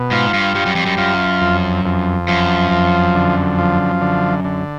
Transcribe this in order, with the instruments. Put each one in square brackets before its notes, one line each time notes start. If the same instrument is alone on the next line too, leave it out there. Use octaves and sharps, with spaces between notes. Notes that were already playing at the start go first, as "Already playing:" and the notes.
Already playing: [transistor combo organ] B2
[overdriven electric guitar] G#2 [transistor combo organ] F4
[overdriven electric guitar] G2
[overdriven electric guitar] G2 [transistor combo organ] G3
[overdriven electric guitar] F#2
F2
F#2
[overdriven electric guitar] F#2 [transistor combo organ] F4
[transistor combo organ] F2
F2
[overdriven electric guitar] F#2 [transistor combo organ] F3
[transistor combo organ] F2
D3
F3
D3
D3